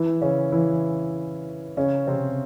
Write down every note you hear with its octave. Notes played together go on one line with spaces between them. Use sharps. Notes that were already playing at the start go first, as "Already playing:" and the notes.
Already playing: E3 E4
C#3 C#4
E3 E4
C#3 C#4
C3 C4